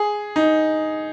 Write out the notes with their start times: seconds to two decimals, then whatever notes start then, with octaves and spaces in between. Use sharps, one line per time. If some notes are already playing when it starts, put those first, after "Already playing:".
Already playing: G#4
0.36 D#4